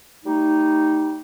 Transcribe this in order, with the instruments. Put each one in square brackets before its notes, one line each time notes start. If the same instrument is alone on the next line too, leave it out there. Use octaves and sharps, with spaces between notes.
[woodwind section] G3 A3 D#4